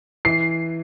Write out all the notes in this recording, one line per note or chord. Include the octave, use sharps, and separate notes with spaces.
E3 C7